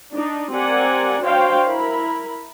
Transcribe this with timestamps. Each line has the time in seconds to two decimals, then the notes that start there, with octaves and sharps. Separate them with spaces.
0.14 D4 D#4
0.52 C4 G4 A#4 D5 F#5 G#5
1.21 D4 F#4 C5 C#5 F5 G5
1.68 E4 A#4 B5